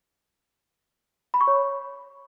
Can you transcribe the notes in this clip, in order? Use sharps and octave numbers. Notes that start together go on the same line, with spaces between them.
B5
C#6
C#5